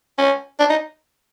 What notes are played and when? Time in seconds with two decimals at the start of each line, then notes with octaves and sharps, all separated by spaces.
0.18 C#4
0.60 D4
0.70 D#4